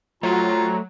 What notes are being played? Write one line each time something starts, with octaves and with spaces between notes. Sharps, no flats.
F#3 A3 C4 D4 F4 A#5